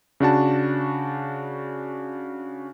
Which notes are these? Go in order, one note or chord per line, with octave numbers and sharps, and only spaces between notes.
C#3 D4 F#4 A5